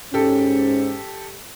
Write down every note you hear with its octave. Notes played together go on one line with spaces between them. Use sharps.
G#2 C#4 G4 A4